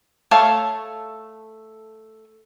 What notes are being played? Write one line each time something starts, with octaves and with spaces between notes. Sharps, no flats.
A3 A4 C#5 F5 A5